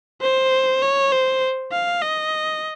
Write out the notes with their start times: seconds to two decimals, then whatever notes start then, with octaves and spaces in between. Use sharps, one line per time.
0.22 C5
0.82 C#5
1.12 C5
1.72 F5
2.02 D#5